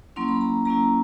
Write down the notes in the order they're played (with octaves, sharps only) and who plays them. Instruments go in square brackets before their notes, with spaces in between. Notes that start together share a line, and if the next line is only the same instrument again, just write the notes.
[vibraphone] F#3 A#3 C#4 E4 C6
B5
A#5
F#3 A#3 C#4 E4 A#5